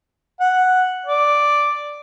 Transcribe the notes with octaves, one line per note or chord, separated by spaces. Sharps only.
F#5
D5